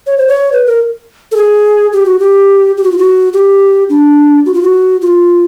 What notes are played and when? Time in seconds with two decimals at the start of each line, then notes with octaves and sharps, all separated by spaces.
0.07 C#5
0.18 C5
0.28 C#5
0.52 B4
0.66 A#4
1.32 A4
1.36 G#4
1.93 G4
2.06 F#4
2.20 G4
2.77 G4
2.84 F#4
2.92 F4
2.98 F#4
3.33 G4
3.89 D4
4.46 F#4
4.54 F4
4.63 F#4
5.02 F4